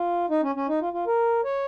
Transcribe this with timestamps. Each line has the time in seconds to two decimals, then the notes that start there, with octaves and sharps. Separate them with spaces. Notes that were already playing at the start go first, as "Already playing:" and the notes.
Already playing: F4
0.30 D#4
0.43 C#4
0.55 C#4
0.68 D#4
0.81 F4
0.93 F4
1.07 A#4
1.44 C#5